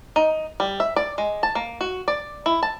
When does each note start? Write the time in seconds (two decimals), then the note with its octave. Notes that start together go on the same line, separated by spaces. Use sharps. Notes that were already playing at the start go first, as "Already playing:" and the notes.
0.16 D#4
0.60 G3
0.80 E5
0.96 D5
1.18 G#3
1.43 A5
1.55 A#3
1.81 F#4
2.08 D5
2.46 E4
2.63 A5